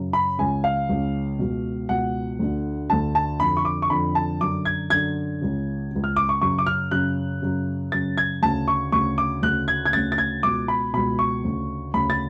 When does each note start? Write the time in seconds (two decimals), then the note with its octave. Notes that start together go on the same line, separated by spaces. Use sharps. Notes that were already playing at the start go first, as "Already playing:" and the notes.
Already playing: F#2 C#3
0.13 B5
0.39 C#2 C#3 G#5
0.64 F5
0.89 C#2 C#3
1.39 C#2 B2
1.89 C#2 B2 F#5
2.39 D2 D3
2.90 D2 D3 A5
3.15 A5
3.40 F2 D3 B5
3.57 C#6
3.65 D6
3.82 C#6
3.90 F2 D3 B5
4.15 A5
4.40 F#2 D3 D6
4.65 G#6
4.90 F#2 D3 G#6
5.41 C#2 C#3
5.91 C#2 C#3
6.04 F6
6.16 D6
6.29 C#6
6.41 F#2 C#3 C#6
6.59 D6
6.67 F6
6.91 F#2 C#3 F#6
7.42 F#2 C#3
7.92 F#2 C#3 A6
8.18 G#6
8.42 D2 C#3 A5
8.68 C#6
8.92 D2 C#3 C#6
9.18 D6
9.42 D2 C#3 F#6
9.68 G#6
9.86 G#6
9.93 D2 C#3 A6
10.12 A6
10.18 G#6
10.43 C#2 B2 D6
10.68 B5
10.93 C#2 B2 B5
11.19 C#6
11.44 D2 C#3
11.94 D2 C#3 B5
12.10 A6